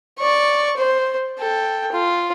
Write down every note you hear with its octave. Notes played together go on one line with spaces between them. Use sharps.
D5 C#6
C5
A4 G5
F4